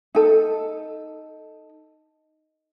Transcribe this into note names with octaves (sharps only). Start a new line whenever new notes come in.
D#4 A4